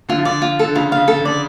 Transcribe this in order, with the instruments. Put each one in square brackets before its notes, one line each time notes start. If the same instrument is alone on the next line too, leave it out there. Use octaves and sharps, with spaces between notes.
[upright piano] D3 [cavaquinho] F4
[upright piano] F3
[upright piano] D3 [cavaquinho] D5
[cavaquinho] F4
[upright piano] D3 [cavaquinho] A4
[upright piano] C#3 [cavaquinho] F4
[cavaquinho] F5
[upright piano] C#3
[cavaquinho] A4
[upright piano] D3
[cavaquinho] D5